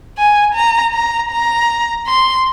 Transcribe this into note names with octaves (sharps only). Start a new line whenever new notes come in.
G#5
A#5
A#5
A#5
C6